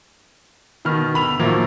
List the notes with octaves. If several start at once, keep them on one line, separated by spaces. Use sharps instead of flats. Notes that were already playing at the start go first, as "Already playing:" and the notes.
B2 D#3 B5 F6
D3 B5 F7
A2 D#3 F3 F#3 A#3 E4